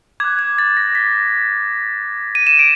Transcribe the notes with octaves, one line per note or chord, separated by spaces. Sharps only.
D6 F#6 G#6
G#6
A6
A#6
B6
D#7
E7
D7